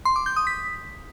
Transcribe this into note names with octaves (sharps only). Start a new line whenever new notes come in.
C6
D6
G6
D#6
B6